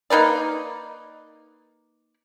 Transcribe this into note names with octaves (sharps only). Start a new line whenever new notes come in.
A#3 D#4 B4 D5